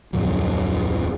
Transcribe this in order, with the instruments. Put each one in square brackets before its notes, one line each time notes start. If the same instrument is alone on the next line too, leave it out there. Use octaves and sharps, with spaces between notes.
[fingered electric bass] D1 F2 D3 F#3